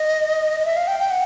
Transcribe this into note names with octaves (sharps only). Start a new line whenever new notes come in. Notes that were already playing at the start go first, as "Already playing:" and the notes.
Already playing: D#5
D#5
E5
F5
G5
G5
F#5